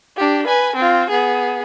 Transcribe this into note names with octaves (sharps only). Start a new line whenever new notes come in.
D4 G4
B4 G#5
C4 F4
B3 G#4